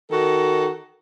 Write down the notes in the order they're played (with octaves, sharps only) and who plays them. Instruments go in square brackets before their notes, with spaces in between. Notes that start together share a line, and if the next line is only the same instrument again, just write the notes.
[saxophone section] D#3 F#4 A4